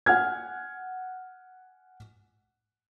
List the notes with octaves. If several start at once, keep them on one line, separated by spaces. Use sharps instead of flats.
F#5 G#5 F6 G#6